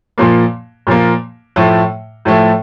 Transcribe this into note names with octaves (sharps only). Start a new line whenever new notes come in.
A#2 F3 A#3
A#2 F3 A#3
A2 F3 A3
A2 F3 A3